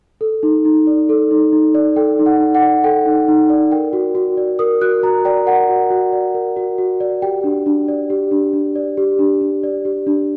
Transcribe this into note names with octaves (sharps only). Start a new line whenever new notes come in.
A4
D#4
D#4
D5
A4
D#4
D#4
D5
A4 G5
D#4
F#5
D#4
F#5
D5
A4 G5
D#4
D#4
D5
A#4 G5
F#4
F#4
D5
A#4 D#6
F#4 F#6
F#4 A#5
D5 G5
A#4 F#5
F#4
F#4
D5
A#4
F#4
F#4
D5
G4 G5
D4
D4
D5
G4
D4
D4
D5
G4
D4
D4
D5
G4
D4